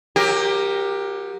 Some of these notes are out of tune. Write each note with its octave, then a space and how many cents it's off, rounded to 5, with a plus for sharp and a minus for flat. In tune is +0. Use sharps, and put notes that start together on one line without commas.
F#3 -25 G4 +15 A#4 +0